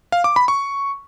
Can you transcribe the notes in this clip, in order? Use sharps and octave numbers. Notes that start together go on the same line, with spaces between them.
F5
D6
B5
C#6